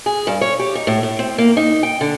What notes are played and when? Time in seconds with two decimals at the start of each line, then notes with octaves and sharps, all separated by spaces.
0.06 G#4
0.27 G2
0.41 C#5
0.59 G4
0.75 D#4
0.87 A2
1.03 A2
1.19 C4
1.38 A#3
1.57 D#4
1.83 G5
2.01 D3